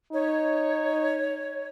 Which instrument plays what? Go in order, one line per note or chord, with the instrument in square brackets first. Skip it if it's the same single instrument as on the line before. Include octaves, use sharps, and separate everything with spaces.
[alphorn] D#4 [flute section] C#5